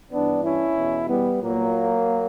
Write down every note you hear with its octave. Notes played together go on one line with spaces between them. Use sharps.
G2 E3 B3 D4
C#4 E4
E2 B2
G3 B3
A#2 F#3 A#3